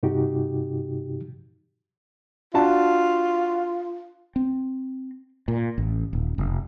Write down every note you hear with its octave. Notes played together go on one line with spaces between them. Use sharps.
G2 C3 D#4 F#4 G4
D4 F4 F#4 A5
C4
A#2
A1
D#1
F1